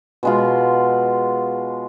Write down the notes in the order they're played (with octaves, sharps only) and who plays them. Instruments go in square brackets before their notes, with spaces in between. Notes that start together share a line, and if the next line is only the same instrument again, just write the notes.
[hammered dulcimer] B2 G#3 F4